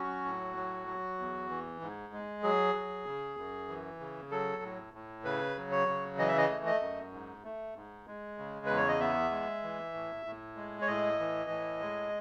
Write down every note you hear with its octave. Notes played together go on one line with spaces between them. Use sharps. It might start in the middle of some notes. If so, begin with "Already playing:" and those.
Already playing: F#3 C#4 F#4
A2
F#3
F#3
E2
E3
G#2
G#3
F#3 G#4
F#3
C#3
F#2
E3
C#3
F#3 A4
A2
A2
C#3 B4
F#3
C#5
C#3
E3 D#5
E5
D#5
A3
D#5
F#2
G#2
A3
G#2
G#3
C#3
E2 B4
C#5
D#5
B3 E5
G#3
E3
A2
A2
G#3
C#5
A2 D#5
E3
A2
G#3